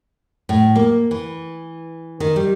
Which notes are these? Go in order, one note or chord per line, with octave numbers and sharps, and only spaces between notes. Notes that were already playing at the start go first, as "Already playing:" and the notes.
A2
A#3
E3
D#3
G3